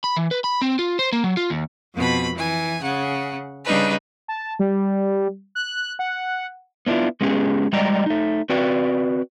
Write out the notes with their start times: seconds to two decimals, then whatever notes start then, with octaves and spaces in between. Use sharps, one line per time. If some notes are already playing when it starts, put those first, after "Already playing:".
0.04 B5
0.16 E3
0.31 B4
0.44 B5
0.62 C4
0.79 F4
0.99 C5
1.12 A#3
1.24 F#3
1.37 F4
1.50 D#2
1.96 F2 B2 B5
2.36 E3 G#5
2.82 C#3 F#5
3.65 C#3 G3 D4 D#4 B4
4.28 A5
4.59 G3
5.55 F#6
5.99 F#5
6.87 B3 C#4 D4 E4 F4
7.21 G#3 B3 C#4 G4 G#4
7.73 G3 G#3 D5 D#5 G5 A#5
8.06 A3 D#4
8.49 C4 F#4 B4 D5 G5